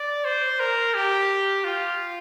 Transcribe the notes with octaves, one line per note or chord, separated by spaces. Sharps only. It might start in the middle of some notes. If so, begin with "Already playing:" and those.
Already playing: D5
C5
A#4
G4
F4